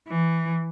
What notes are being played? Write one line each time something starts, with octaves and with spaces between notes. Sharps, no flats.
E3